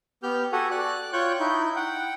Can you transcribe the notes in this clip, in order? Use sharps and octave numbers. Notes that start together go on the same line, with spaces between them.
B3 G4 F6 G6
F#4 G4 A4 F#5 G#5
D5 F#6
F4 C#5 G5 C#6 F#6 G6
D#4 E4 G6
F#5 G5